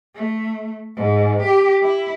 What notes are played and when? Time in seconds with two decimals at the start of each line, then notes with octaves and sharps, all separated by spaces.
0.15 A3
0.96 G#2
1.42 G4
1.82 E4